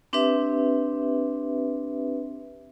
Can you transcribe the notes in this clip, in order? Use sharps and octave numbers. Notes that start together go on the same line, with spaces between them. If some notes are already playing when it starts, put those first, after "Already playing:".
C4 D4 G4 B4 E5